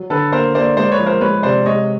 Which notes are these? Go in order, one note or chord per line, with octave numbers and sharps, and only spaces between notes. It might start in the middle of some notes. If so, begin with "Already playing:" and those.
Already playing: F#3
D3 A4 B4
A#3 A#4 C5
A#3 C5 D5
G#3 C5 D5
B4 C#5
F3
A#4 C5
G#3 B4 C#5
C3 C5 D5
G#3 C#5 D#5